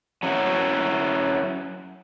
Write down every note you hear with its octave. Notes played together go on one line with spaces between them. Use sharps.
F#3 C#4 E4 F#4